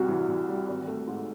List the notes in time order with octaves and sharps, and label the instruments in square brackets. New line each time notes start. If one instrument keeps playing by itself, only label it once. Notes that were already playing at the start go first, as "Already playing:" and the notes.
Already playing: [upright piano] C2 C3 G3 [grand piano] F#4
[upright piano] E3
E3
G3
G#1
A3
G#2